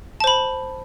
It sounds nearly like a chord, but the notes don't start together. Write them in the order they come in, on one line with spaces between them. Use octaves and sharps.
A5 C5 B5